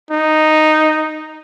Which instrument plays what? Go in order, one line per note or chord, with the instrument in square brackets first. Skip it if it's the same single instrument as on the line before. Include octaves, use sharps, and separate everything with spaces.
[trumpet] D#4